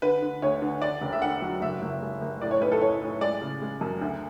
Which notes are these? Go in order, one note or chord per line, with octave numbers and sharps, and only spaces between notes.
D3 B4
D3
D2 C#5
D3
D3 D5
E1
E5
D3 F#5
F#3
F#1 E5
F#1
G#3
F#1
A2 D5
C#5
B1 B4
A4
E3 C#5
A2
G#3 D5
C#3
G#3
F#2
D2